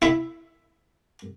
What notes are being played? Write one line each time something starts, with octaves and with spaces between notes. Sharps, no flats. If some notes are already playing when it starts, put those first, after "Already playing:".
E4 E5